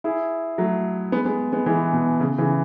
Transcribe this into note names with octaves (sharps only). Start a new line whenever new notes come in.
E4 G#4
F#3 A3
G#3 B3
G#3 B3
G#3 B3
E3 G#3
B2
C#3
C#3 E3